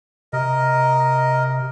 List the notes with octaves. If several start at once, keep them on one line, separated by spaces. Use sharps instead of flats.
C3 A#4 D#5